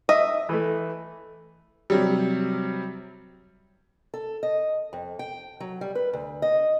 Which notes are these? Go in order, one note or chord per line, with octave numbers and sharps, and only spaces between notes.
D#5 E5
E3 A3
C3 F#3 G3
A4
D#5
F2
G5
F#3
G3
B4
D2
D#5